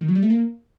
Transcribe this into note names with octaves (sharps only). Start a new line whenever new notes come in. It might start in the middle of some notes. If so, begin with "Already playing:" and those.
D#3
F#3
G3
A3
A#3